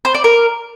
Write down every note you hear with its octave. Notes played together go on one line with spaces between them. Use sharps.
C5
D5
A#4